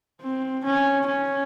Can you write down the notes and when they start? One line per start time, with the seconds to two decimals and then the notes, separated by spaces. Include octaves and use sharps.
0.22 C4
0.65 C#4
1.07 C#4